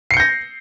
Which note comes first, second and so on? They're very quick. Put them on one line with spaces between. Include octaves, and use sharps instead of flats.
C7 C#7 G6 A#6